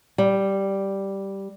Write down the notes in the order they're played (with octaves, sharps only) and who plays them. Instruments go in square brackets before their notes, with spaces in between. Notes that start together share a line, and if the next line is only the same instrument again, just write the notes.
[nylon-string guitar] G3